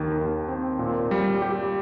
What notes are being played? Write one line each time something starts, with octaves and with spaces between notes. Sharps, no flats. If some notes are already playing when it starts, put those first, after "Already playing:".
Already playing: D#2 D#3
D#2
C4
A#2
G3
G4